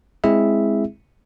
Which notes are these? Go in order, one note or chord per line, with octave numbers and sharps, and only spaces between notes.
G#3 C4 E4 G#4 E5